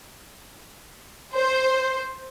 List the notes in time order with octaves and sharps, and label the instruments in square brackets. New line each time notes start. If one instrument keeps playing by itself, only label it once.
[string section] C5